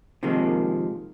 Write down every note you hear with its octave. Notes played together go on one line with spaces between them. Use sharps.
C3 D#3 F3 G#3 A#3